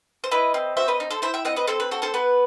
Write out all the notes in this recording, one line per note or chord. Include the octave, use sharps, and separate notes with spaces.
C5
E4 B4 D#5
C4
F#4 C5 E5
B4 D#5
D#4
A4 C5
E4 C5 E5
E5 G5
C4 D#5 F#5
B4 D#5
C4 A4 C5
B4
F#4 A4
A4 C5
B3 B4